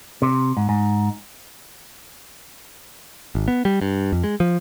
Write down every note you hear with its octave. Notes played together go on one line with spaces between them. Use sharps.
C3
G#2
G#2
G#1
B3
G3
G2
F2
G#3
F3